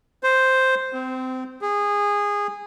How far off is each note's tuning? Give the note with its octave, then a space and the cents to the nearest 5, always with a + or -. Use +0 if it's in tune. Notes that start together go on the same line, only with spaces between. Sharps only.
C5 +0
C4 -25
G#4 -20